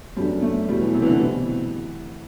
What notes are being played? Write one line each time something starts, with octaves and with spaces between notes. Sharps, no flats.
F#2 F#3 G3 B3 D4 A4
A3
E2 B2 F#3 G3
E3
C3
E3
D3
B2 E3 G3 C4